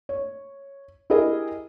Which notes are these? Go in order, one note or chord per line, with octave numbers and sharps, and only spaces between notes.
C#5
E4 G4 G#4 A#4 D#5